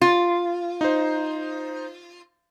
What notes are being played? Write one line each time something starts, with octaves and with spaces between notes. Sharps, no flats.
F4
D#4 C5